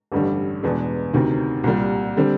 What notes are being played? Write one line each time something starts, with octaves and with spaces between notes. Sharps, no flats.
A1 G2 D3 G3
E2 B2 G#3 B3 D4
D2 C3 D#3
C2 A#2 G3
D3 G3 C4